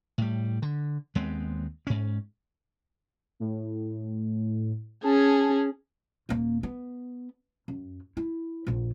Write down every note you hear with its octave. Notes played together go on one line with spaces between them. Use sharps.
A2 G3
D3
D#2 G#3 B3 C4
G#2 C#4
A2
C#4 G#4 A5
D#1 A#3
B3
F#2
E4
A#1 F2